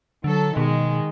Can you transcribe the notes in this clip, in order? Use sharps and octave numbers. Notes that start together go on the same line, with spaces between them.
D3 F#3 A4
B2 D#3 G#3